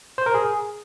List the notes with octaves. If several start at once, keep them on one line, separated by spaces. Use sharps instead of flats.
C5
A#4
G#4